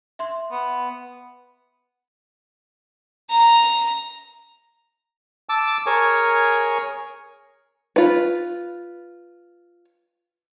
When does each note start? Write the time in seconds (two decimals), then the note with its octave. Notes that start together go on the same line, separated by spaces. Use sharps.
0.19 E5 C6
0.51 B3
3.30 A#5
5.49 A5 D6 E6
5.86 G#4 A#4 C#5 G#5 C#6
7.96 F4 B4